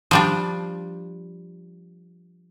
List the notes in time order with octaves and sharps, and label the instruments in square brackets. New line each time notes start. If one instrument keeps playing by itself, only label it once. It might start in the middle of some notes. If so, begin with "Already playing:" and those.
[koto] F3 G3 D4